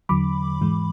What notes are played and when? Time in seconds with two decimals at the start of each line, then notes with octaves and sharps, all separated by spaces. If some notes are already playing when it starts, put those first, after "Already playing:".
0.09 E2 D3 F#3 B5 D6
0.61 G#2 E3 G#3